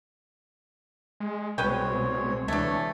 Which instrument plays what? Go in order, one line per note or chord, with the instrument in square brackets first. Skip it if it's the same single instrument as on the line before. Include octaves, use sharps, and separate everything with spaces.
[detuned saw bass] G#3
[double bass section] C2 G#3 C4 [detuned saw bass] B2 [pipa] C#4 B4 G5 [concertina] C#5
[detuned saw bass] D2 [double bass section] C3 E3 G#3 [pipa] A3 D4 [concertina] C#5